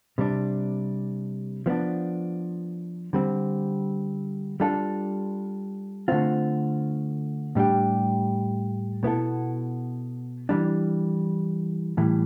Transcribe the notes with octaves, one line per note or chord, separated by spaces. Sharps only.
C3 G3 D4
F3 B3 D4
D3 G3 C4
G3 D4 F4 A4
D3 A3 C4 F4
A2 G3 D4 G4
B2 B3 E4 A4
E3 G3 D4
A2 E3 G3